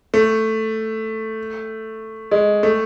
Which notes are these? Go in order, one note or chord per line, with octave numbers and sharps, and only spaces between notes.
A3
G#3
A3